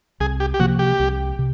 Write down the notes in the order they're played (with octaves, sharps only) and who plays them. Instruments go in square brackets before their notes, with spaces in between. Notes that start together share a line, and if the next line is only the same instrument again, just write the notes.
[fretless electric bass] C2 [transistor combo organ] G#4
[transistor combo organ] G4
G4
[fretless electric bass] C3 F3 A#3 [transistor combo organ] F#4
[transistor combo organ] G4
[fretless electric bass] C2
C3